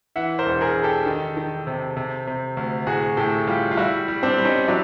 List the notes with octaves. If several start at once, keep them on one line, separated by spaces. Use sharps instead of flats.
E3 E5 F#5
A#4 C5
E1
G#4 A#4
E1
G4 A4
D#3
D#3
C3
C3
C3
D2
A2 F#4 G#4
A2 G4 A4
G3 F4 G4
F4
G3 E4 F#4
G3
C4 D4
G3
C#4 D#4
F#3 D4 E4